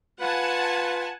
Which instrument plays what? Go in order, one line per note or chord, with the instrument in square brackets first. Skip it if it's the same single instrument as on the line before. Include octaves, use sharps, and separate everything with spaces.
[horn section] F4 B4 [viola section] F#5 G#5 A5